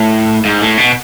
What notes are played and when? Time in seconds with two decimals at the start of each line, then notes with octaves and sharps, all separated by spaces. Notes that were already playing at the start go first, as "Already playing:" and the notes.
Already playing: A2
0.45 G#2
0.62 A2
0.78 B2